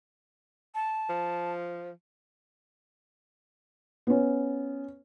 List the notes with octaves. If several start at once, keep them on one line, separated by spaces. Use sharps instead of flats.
A5
F3
B3 C#4